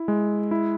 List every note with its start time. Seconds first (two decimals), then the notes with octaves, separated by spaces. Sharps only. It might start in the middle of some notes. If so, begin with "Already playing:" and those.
Already playing: E4
0.08 G#3
0.51 E4